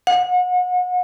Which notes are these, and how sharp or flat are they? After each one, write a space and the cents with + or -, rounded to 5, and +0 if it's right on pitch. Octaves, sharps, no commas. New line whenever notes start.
F#5 -35